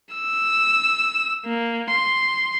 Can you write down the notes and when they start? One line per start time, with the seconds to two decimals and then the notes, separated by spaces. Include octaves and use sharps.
0.15 E6
1.46 A#3
1.91 C6